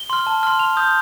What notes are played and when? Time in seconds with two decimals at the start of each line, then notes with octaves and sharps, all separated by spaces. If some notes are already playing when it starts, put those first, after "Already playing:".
Already playing: G7
0.10 C6 F6
0.27 A5
0.43 C6 F6
0.59 C6 F7
0.77 D#6 G6